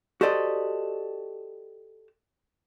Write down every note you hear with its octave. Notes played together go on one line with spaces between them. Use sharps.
F#4 G4 A4 C5 D5 D#5